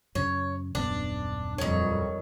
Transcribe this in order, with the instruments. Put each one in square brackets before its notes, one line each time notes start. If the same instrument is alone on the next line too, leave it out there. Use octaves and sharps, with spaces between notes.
[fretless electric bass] F#2 C#3 [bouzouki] C#5
[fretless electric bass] D#1 F#2 B3 [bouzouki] D4
[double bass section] F2 F#3 G3 [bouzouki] D#3 C#5